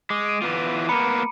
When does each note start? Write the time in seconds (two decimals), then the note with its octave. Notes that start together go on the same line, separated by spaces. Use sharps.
0.10 G#3 D6
0.26 D7 D#7
0.42 E3 B3 F4
0.89 A#3 B3 A#5 B5 C#7